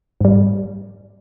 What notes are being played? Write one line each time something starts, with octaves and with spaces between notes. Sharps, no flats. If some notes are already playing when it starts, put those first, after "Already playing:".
G#2 G3